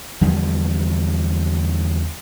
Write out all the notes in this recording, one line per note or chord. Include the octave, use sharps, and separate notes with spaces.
E2 D3 F3 G3